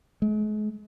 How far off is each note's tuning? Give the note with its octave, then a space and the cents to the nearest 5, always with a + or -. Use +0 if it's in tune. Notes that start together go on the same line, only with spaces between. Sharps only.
G#3 +40